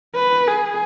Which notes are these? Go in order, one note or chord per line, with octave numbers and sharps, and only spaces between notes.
B4
G#4